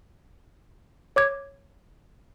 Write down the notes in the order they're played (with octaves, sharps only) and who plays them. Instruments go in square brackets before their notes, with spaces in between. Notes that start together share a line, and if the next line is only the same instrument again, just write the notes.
[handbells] C#5 D6 G#6